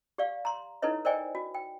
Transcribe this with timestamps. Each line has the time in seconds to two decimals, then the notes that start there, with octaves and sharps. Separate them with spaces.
0.18 G4 D5 F5
0.45 A#5 C6
0.82 D#4 E4 A4 B4 C#5 D#5
1.05 A#4 C5 D5 D#5 G5 G#5
1.35 F#4
1.54 G5